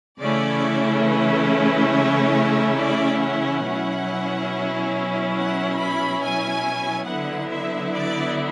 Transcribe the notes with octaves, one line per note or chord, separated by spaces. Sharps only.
C#3 E3 A3 C#4 E4 D5
B4
C#5
D5
F#5
B2 F#3 C#4 E4
F#5
B5
G#5
D3 F#3 B3 E4 F#5
E5
D5